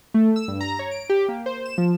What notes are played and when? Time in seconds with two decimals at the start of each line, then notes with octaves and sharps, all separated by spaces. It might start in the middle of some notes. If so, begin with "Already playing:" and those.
0.14 A3
0.36 E6
0.48 G2
0.61 A#5
0.79 C#5
0.91 D7
1.10 G4
1.29 A#3
1.46 C5
1.66 E7
1.78 F3